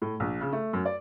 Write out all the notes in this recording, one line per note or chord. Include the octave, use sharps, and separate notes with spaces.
A2
A#1
C#3
A3
F#2
D5